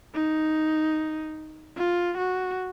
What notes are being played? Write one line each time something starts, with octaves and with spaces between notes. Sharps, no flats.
D#4
F4
F#4